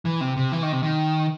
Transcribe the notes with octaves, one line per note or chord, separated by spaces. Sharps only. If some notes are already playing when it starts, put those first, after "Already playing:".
E3
C3
C3
E3
D#3
C3
D#3